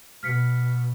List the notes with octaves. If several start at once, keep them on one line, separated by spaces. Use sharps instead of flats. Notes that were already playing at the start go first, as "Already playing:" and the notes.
B2 F6 B6 C#7